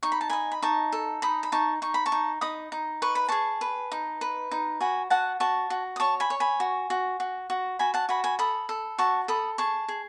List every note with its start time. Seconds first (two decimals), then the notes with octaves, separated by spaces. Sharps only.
0.03 D#4 C#6
0.12 B5
0.21 A5
0.30 D#5 G#5 B5
0.52 B5
0.62 D#4 A5 C#6
0.92 A4
1.22 D#4 B5 D#6
1.43 B5
1.52 D#4 A5 C#6
1.82 D#4 C#6
1.94 B5
2.06 A5 C#6
2.12 D#4
2.41 D#4 B5 D#6
2.72 D#4
3.02 B4 C#6
3.15 B5
3.29 G#4 A5 C#6
3.61 B4
3.92 D#4
4.21 B4
4.51 D#4
4.80 F#4 G#5 B5
5.10 F#4 F#5 A5
5.40 F#4 A5 C#6
5.70 F#4
5.96 D#6
6.00 C#5 A5 C#6
6.20 G#5 B5
6.30 C#5
6.40 G#5 B5
6.60 F#4
6.90 F#4
7.20 F#4
7.50 F#4
7.79 F#4 G#5 B5
7.94 F#5 A5
8.09 F#4 G#5 B5
8.24 G#5 B5
8.39 A4 B5 D#6
8.69 A4
8.98 F#4 A5 C#6
9.28 A4 B5 D#6
9.58 G#4 A5 C#6
9.88 G#4